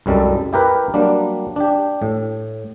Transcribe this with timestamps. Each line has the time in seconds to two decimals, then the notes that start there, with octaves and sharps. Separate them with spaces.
0.06 C2 F#2 G3 G#3 A4
0.53 E4 G4 A#4 B4
0.94 F#3 G3 A#3 D4
1.56 D4 G4
2.02 A2